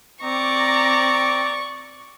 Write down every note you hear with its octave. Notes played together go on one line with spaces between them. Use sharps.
C4 D5 A#5 C#6 D6